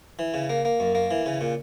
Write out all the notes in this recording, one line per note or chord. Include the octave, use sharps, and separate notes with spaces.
E3
C#3
A#3
A#3
F#2
A#3
E3
C#3
A#2